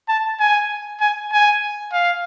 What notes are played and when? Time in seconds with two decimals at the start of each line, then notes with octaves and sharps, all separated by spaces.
0.08 A5
0.40 G#5
1.01 G#5
1.32 G#5
1.93 F5